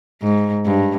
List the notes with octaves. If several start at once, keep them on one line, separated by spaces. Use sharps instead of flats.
G#2
G2